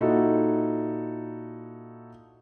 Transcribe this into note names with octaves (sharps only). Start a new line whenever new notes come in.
A#2 D#4 E4 F#4 A4